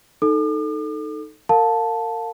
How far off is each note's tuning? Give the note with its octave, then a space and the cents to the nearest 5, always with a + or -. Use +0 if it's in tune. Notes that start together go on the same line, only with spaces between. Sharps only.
D#4 +0 A4 +0 D6 +45
A#4 -35 F5 +20 A5 +0